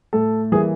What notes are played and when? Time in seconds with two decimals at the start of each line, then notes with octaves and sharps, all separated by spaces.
0.13 A2 A4
0.52 E3 G3 A#3 G#4